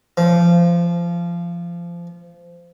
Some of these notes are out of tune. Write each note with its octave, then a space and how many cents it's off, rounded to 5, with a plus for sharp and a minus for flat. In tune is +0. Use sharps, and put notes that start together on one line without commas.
F3 -20